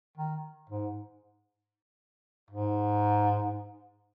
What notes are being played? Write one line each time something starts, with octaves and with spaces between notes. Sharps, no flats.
D#3
G#2
G#2